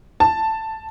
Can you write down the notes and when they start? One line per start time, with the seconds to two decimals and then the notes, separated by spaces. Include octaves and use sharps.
0.20 A5